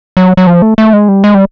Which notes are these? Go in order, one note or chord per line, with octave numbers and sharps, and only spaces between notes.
F#3
F#3
F3
A3
A3
G#3
G3
G#3
G3